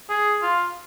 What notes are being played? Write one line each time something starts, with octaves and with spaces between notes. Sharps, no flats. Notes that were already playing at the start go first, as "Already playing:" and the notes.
G#4
F4